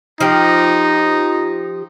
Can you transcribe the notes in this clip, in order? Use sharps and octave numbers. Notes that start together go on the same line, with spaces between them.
F3 D#4 G4